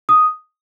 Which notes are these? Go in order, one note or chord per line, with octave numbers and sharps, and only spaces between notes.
D#6